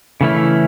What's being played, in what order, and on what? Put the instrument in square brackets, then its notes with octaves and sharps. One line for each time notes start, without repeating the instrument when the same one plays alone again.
[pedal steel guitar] C#3 E3 A3 C#4 E4